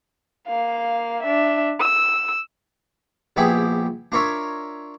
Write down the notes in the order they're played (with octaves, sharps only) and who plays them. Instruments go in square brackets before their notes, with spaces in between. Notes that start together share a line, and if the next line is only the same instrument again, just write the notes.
[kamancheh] A#3 F5
D4 E5
E6
[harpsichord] A#1 B3 E4 G4 G#4 B5
D4 F4 A#4 C#5 E5